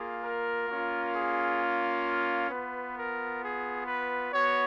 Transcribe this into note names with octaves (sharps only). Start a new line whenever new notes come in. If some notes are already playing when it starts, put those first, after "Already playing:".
Already playing: A#3 F4 G#4
A#4
A#3 C#4 F4
G#4
B3 F4 B4
A#4
G#4
B4
B3 F#4 C#5